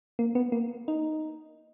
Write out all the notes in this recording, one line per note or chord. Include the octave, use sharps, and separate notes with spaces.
A#3
B3
A#3
D#4